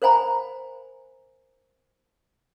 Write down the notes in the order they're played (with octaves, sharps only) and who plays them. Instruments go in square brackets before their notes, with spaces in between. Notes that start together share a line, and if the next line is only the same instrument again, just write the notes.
[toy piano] A#4 C5 F5 G#5 A#5 B5